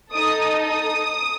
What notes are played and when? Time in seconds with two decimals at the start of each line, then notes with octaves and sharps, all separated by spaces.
0.13 D#4 A4 D#6
0.63 D#6